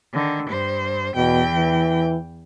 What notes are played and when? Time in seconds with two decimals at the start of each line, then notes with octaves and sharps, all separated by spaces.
0.13 D3 D#3
0.49 G2 C5
1.15 E2 B2 G5
1.54 E3